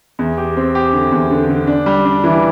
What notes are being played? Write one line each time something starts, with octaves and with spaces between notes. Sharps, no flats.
E2
G4
C4
G4
D3
E2
D3
D3
D4
G3
D4
E3